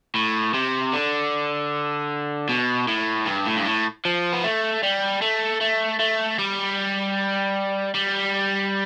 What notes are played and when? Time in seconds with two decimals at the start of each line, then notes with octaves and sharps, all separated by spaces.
0.15 A2
0.54 C3
0.93 D3
2.49 B2
2.88 A2
3.27 G2
3.46 A2
3.57 G2
3.66 A2
4.05 F3
4.33 B3
4.44 A3
4.83 G3
5.22 A3
5.61 A3
6.00 A3
6.39 G3
7.94 G3